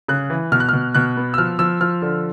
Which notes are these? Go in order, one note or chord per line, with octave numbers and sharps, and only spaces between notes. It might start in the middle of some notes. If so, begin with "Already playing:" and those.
C#3 F#6
E3
B2 F6
F#6
B2 F6
B2 F#6
B3
E6
F3 F6
F3 E6
F3 F6
D3